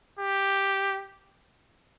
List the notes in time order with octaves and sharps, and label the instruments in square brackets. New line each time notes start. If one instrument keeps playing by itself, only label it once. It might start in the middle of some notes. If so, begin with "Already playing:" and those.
[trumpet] G4